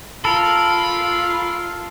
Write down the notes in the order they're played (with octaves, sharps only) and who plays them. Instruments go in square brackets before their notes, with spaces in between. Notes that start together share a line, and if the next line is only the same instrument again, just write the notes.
[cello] F4 [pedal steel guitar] A4 A#4 [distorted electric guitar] B5